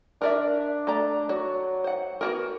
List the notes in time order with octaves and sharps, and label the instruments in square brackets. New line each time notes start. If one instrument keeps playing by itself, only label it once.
[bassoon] D4 [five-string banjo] A#4 D5 E5
[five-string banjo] A3 D5 A#5
[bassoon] F#3 [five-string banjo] F#4
[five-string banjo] C5 F#5
B3 F#4 A#4